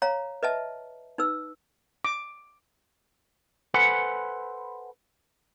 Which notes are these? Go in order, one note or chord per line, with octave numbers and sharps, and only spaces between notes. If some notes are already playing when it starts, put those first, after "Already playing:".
C#5 F5 A#5
B4 D#5 E5 A5
D#4 B4 E6
D6
A4 B4 C5 F#5 G#5 B5